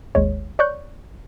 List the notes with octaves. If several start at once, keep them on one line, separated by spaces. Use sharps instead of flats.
G#1 D#2 G#3 C#5
C#5 D5 C#6 F#6 G6